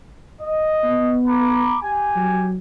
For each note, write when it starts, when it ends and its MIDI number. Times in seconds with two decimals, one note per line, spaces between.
0.41 1.17 75
0.84 1.77 59
1.28 1.78 82
1.28 1.78 83
1.28 1.78 86
1.83 2.50 67
1.83 2.50 80
2.16 2.58 54